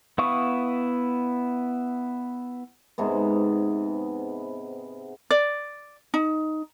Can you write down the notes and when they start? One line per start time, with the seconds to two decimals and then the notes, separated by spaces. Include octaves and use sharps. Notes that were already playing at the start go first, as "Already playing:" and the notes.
0.18 B3 E4 F5 C#6 D#6
2.98 G#2 C3 B3
5.31 D5
6.14 D#4